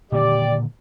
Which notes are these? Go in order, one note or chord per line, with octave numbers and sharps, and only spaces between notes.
A#2 D3 D#3 G4 D5